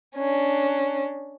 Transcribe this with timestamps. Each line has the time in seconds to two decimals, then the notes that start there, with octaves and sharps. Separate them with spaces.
0.16 C#4 D4